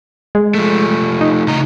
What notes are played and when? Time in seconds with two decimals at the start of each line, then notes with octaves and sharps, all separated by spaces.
0.35 G#3
0.54 F3 A3
1.21 D#4
1.48 C#3 D#5 A#5